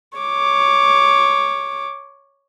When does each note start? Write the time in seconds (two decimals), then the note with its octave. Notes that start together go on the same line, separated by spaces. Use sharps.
0.17 C#5 D6